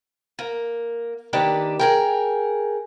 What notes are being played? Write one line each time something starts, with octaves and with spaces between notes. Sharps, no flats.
A#3
D#3 A#3 D4 G4 B4
G#4 A#4 G5